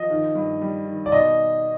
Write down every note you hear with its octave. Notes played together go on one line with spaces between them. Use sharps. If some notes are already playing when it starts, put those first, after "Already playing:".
Already playing: F3 D#5
D#3
G2
G3
D#3
D5
B2 D#5